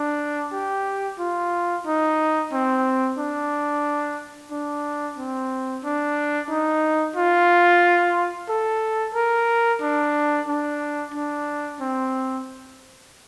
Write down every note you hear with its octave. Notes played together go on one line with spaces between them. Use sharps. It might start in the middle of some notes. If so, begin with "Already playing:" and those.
Already playing: D4
G4
F4
D#4
C4
D4
D4
C4
D4
D#4
F4
A4
A#4
D4
D4
D4
C4